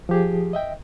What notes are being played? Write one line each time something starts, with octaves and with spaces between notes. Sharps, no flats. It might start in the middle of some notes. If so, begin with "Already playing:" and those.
F3 G4 G#4
D#5 E5 G5